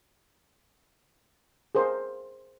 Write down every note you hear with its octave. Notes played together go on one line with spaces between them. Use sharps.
G#4 A#4 C5